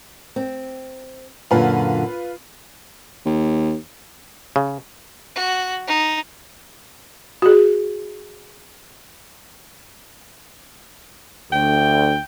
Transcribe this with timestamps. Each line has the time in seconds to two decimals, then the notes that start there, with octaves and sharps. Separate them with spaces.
0.36 C4
1.51 F#2 A#2 D3 F4 B4
3.26 D#2
4.56 C#3
5.35 F#4
5.88 D#4
7.42 F#4 G#4
11.52 D2 G5